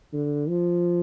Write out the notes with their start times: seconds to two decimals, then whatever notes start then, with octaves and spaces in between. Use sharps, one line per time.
0.13 D3
0.48 F3